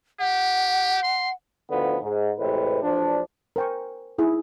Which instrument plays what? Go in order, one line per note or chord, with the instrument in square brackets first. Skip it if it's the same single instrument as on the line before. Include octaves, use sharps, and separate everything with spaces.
[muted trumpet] G4 [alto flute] F#5
[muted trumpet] C6
[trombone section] D2 D3 D#3 F3 B3
G#2
A1 A2 C3 G#3 B4
A1 F3 D4
[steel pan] A#4 C5 G5 G#5 C#6
D#4 E4 G#4